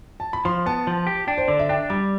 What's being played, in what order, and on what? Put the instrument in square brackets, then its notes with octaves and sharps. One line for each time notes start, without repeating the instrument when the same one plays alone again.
[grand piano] A5
B5
[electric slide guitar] F3 [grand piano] C6
[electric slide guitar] B3 [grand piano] A5
[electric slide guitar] F3
G4
[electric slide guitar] D4 [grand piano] G5
[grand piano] C5
[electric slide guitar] D3 [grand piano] D5
[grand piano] E5
[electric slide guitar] D4 [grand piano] G5
[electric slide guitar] G3 [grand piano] D6